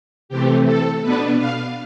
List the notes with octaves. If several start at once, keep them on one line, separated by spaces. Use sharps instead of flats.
C3 E3 A3 C4 G4
A4
B2 B3 D4 B4
F5